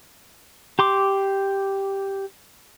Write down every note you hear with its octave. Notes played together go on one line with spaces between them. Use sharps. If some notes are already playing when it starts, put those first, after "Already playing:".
G4 C6 D6